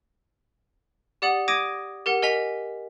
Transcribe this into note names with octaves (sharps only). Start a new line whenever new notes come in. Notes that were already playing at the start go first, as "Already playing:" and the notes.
G4 D5 F#5 D#6 F#7
D6 D#6 G#6 A#6 D7 D#7
G4 A#4 F#5
A#4 D#5 G#5 B6 F7